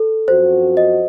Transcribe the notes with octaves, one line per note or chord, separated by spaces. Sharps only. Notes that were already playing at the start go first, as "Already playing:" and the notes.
Already playing: A4
F#2 F3 C4 F#4 C5
D#5